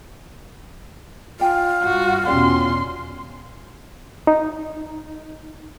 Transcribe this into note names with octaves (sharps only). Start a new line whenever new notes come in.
F4 D5 G5 G#5
G2 F#4
E2 B2 C#4 F#4 G4 D5 C6
D#4